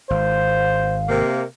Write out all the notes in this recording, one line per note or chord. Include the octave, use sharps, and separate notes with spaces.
G#1 C5 F5
C3 A#3